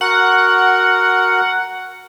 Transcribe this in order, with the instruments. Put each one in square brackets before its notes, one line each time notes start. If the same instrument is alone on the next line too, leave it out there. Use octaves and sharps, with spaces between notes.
[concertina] F#4 A#4 [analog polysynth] F#5